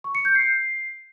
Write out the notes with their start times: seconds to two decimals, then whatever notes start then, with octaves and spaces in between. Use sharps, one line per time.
0.04 C#6
0.15 C#7
0.25 G6
0.35 C7